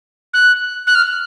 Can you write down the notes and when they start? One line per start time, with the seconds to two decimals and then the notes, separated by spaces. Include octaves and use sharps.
0.34 F#6
0.87 F#6
0.95 F6